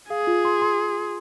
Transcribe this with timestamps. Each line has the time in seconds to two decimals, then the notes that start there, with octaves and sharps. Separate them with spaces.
0.10 G#4 F5
0.27 F4
0.45 C6
0.62 C6